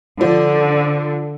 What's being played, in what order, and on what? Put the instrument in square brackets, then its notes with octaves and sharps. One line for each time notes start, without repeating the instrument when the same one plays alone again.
[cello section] D3 [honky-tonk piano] F3